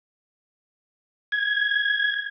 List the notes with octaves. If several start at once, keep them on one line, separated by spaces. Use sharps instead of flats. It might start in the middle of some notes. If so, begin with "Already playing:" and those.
G#6